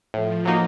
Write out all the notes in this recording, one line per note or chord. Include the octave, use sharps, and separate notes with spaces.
A2 F3
F#3 A#3 D#4